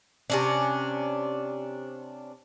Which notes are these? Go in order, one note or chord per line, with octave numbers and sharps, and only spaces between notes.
C3 C#4 D4